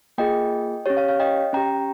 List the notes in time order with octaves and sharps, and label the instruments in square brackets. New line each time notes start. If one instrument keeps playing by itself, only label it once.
[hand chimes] A#3 F4 G#4 D#5 G5
C#4 G4 C#5
C#5 F5
C#5 F5
D#5 G5
C#4 G4 G5 A#5